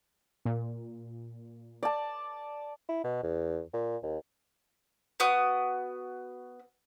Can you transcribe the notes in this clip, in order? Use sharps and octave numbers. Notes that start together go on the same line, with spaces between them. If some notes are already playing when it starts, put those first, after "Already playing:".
A#2
D5 A5
E4
B2
E2
A#2
D#2
B3 F#4 D#6